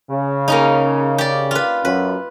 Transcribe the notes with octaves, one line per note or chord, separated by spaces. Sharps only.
C#3
A#3 C#4 D#4
G4 D5
F4 B4
F#2 B4